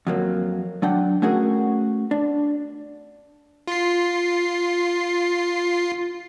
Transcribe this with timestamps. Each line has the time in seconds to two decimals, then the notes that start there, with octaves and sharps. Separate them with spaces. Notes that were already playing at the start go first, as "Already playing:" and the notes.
0.07 F2 F#3 A#3
0.82 F#3 D4 F#5 G5
1.22 A3 C#4 F#4 G#4 A#4
2.11 D4
3.67 F4 C7